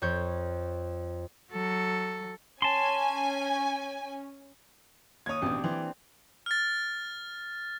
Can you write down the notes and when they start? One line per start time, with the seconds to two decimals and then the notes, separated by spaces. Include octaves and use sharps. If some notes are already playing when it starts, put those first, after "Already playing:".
0.02 F2 C#5 G6
1.51 F#3 A4
2.62 C#4 G#5 A5 C6
5.26 D#2 C#5 D#6 G#6
5.42 A1 B2 C4 D4 G4
5.64 E3 C4
6.46 F6 A6